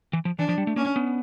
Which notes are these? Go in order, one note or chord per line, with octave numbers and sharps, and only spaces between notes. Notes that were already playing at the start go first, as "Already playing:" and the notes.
E3
F3
E3 D4
F3
G3
A3
A#3 C#4
B3